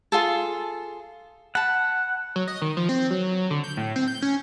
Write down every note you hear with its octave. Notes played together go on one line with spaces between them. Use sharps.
F4 G#4 A4
F#5 A5 B5
F#3
D#5
D#3
F3
C4
F#3
D3
G6
A2
C4
G6
C#4